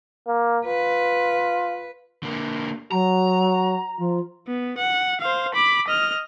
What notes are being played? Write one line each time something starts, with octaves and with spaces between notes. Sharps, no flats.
A#3
F4 B4
D3 A#3
F#3 F#4 A#5
F3 F4
B3
F#5
C5 F5
B5 D6
D#5 F6